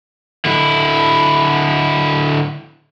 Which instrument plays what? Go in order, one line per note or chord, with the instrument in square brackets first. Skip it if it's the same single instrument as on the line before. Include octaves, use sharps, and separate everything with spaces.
[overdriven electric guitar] D3 E4